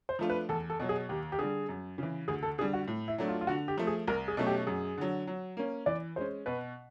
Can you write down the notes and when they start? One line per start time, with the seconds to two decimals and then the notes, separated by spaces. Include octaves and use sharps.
0.09 C5
0.19 F3 A3 D4 F4
0.30 B4
0.49 E2 A4
0.70 A4
0.80 B2 F#3
0.89 G#4
1.09 D#2 G4
1.32 G4
1.38 D3 G3 G#4
1.69 F#2
1.98 C#3 E3
2.28 D2 G#4
2.43 A4
2.58 D3 G3 G#4
2.73 F#4
2.88 A2
3.08 E4
3.18 F#3 A3 D4
3.28 F4
3.41 F4
3.47 D3 F#4
3.68 G4
3.78 F3 A3
3.87 G#4
4.08 C2 A#4
4.28 G#4
4.37 B2 F#3 A3 C#4
4.47 G4
4.67 F#2 G#4
4.98 D3 F#3
5.27 F#3
5.57 A#3 C#4
5.86 E3 D5
6.16 G#3 C#4 C5
6.46 B2 B4